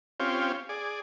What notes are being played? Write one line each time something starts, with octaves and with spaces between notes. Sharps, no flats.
C4 C#4 F4 G4
G#4 D5